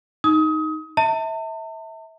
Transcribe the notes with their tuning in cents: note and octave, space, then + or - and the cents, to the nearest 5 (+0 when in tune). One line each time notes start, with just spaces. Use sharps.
D#4 +0 D#6 +25
E5 -25 A5 +40